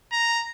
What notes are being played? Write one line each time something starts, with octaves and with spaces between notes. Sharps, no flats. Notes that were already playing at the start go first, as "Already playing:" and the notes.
A#5